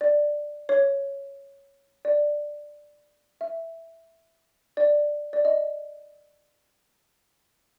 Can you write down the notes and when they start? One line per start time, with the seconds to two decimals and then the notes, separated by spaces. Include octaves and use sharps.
0.01 D5
0.69 C#5
2.05 D5
3.41 E5
4.77 D5
5.33 D5
5.45 D#5